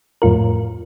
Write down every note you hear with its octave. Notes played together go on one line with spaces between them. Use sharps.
F2 A2 F4 A#4